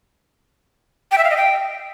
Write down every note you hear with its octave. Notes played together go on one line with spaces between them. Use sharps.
G5
E5
F5
D#5
G5